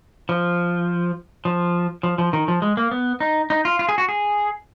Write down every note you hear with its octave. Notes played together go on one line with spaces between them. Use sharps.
F3
F3
F3
F3
D#3
F3
G#3
A#3
B3
D#4
D#4
F4
F4
G#4
F#4
G#4